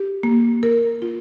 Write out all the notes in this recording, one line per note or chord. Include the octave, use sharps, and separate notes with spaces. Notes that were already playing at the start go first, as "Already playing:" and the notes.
Already playing: G4
A#3
A#4
F4